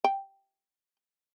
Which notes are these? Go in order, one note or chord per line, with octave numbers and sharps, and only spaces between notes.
G5